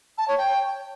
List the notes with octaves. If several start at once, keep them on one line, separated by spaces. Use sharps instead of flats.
A5
C#5
G5